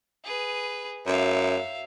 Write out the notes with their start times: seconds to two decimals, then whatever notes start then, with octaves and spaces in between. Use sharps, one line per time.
0.24 G#4 B4
1.07 F#2 E5 F5